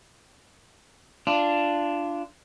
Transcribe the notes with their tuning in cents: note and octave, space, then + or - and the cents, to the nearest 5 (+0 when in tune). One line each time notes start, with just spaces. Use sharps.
D4 +0 F4 -20